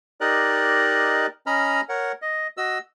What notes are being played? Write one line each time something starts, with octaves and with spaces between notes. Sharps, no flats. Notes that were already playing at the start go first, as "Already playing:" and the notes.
D#4 G4 A#4 D5 D#5 F#6
C#4 D#5 A#5 B5 F6
A#4 C#5 F#5
D#5
F#4 D#5 E6